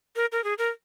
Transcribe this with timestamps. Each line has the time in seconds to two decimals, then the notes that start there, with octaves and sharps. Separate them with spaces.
0.16 A#4
0.32 A#4
0.44 G#4
0.58 A#4